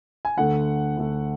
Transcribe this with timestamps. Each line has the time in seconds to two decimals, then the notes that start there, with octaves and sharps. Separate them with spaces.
0.25 G#5
0.37 D2 D3 A3 F#5
0.97 D2 D3 A3